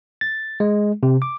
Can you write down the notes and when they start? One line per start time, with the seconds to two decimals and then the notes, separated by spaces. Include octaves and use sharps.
0.21 A6
0.60 G#3
1.03 C3
1.22 D6